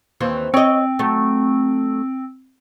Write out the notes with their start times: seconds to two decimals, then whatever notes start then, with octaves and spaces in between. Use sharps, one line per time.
0.20 D#2 E3 C4
0.54 C4 C#5 D#5
0.99 F#3 A3